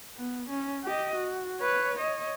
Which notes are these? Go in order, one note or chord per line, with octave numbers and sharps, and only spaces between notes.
B3
C#4
G4 D#5
F#4
B4 C#5
C#5 D#5